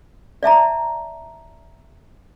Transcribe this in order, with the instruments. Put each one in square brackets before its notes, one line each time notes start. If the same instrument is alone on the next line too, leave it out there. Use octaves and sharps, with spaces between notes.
[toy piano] D5 E5 A5 A#5